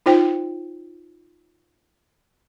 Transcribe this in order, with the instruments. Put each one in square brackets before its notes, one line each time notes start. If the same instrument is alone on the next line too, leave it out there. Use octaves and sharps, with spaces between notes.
[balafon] D#4 F4 C5 G5